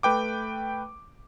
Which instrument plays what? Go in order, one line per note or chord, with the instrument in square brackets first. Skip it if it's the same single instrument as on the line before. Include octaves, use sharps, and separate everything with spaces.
[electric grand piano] A3 B4 G5 D6